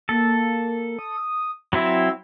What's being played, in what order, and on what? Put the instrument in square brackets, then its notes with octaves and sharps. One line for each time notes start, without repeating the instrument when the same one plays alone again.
[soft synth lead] A#3 [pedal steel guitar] A4
[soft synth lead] D#6
[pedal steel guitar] F#3 C4 E4 [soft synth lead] E6